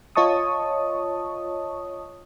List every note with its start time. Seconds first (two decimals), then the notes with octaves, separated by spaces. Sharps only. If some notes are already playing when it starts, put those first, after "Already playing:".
0.16 F4 C#5 D#5 A5 C#6 D#6